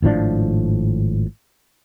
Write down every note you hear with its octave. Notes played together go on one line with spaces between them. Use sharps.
G#1 A2 F3 D4